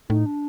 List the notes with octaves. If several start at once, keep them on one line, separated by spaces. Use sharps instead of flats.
A2 D#4
D4